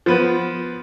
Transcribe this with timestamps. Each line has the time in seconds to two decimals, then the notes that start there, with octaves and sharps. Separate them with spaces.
0.06 F3 B3